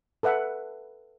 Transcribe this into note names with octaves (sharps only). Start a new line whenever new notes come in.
A4 B4 E5 F#5